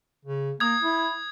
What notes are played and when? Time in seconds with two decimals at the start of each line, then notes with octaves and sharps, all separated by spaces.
0.25 C#3
0.60 A#3 D#6 G#6
0.82 E4